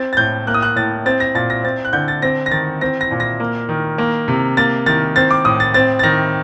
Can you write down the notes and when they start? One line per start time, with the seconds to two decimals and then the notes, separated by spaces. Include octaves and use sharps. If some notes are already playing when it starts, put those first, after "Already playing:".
Already playing: C4 A6
0.13 A6
0.17 A2 G6
0.47 A#3 F#6
0.54 D#6
0.62 F#6
0.76 A2 A6
1.06 C4 A6
1.20 A#6
1.35 A#2 A6
1.50 A#6
1.64 C4 A6
1.85 F#6
1.93 D3 G6
2.08 A6
2.22 C4 A#6
2.46 A#6
2.51 D#3 A6
2.81 C4 A#6
3.01 A#6
3.11 A#2
3.20 A#6
3.40 A#3
3.69 D#3
3.98 A#3
4.28 C3
4.57 A#3 A6
4.86 D#3 A6
5.16 C4 A6
5.31 D6
5.45 A2 D#6
5.60 A6
5.74 C4 A6
5.99 A6
6.03 D#3 A#6